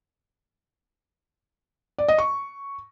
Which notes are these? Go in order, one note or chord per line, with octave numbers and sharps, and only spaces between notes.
D5
D#5
C#6